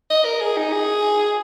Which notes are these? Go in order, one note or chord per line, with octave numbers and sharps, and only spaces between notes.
D#5
A#4
G#4
D#4
G#4